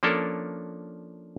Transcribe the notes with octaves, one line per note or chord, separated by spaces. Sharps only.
F3 A#3 C#4 D4 A4 A#4